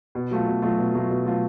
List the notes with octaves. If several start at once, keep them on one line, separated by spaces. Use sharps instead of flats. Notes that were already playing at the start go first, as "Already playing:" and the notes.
B2
F#3 A3 F4
B2
F#3 A3 F4
B2
F#3 A3 F4
B2
F#3 A3 F4